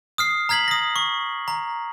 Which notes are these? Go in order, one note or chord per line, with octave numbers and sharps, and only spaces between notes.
D#6 F6 C7
A#5 F6 G#6 B6 F#7
D#6 A#6
C#6
A#5